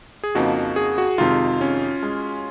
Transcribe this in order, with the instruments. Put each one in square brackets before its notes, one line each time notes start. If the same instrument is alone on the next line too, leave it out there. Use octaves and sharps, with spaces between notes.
[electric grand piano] G#4
[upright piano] F2 C#3 F3 A#3 D#4 [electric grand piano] F#4
[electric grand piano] G#4
F#4
[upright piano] F2 C3 D#3 G#3 [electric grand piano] F4
[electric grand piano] C#4
[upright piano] G#3